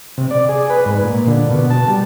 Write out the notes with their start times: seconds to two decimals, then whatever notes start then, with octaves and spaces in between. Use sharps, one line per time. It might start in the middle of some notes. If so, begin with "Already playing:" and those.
0.18 C3
0.31 D5
0.49 G#4
0.70 B4
0.85 G#2
1.03 A#2
1.27 D3
1.50 B2
1.70 A5
1.88 G3